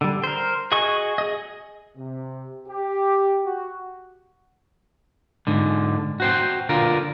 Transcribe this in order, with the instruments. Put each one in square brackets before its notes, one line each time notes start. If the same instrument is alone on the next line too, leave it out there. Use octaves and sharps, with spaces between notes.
[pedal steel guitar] D3 G3
A#4 C5
F#4 G#4 D#5 G#5 C#6
G#4 D#5
[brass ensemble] C3
G4
F#4
[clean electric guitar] G#2 D3
F#4 C5 G5
D3 F4 A#4